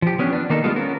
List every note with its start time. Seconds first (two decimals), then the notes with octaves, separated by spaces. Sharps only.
0.02 F3 G4
0.19 B3 C#4 D4 G4
0.33 D4
0.50 D#3 A#3 D#4 A4
0.64 G3 G#3 B3 F4 A4
0.76 B3 C#4 A#4